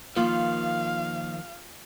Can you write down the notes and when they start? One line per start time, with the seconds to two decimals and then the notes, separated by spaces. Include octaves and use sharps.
0.16 D#3 F3 A#3 F4 F5